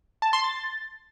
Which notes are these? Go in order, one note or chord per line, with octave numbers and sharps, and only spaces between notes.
A5
C6
A6